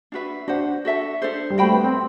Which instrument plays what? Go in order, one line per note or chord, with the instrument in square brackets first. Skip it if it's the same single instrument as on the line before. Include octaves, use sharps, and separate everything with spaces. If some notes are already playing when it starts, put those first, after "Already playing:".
[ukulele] D4 F#4 B4 E5
[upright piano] D4 [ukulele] F#4 C5 F#5
[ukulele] F#4 A4 E5 A5
D4 A4 C5
[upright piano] G3
[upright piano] A3 [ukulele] F#4 C5 G5 B5
[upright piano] B3
C4